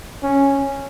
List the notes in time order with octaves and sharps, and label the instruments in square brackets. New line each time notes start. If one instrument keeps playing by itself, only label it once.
[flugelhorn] C#4